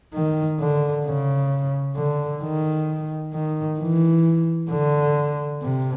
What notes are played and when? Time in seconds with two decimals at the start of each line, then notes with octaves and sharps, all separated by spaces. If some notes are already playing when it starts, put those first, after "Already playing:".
0.14 D#3
0.60 D3
1.05 C#3
1.96 D3
2.42 D#3
3.33 D#3
3.80 E3
4.70 D3
5.62 C3